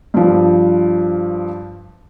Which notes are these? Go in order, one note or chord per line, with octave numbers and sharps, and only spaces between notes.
G2 F3